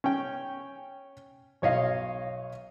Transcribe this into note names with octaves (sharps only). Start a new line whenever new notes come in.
C#4 G5
B1 C#5 D#5 F5